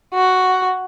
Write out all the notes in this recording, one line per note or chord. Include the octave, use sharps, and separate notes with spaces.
F#4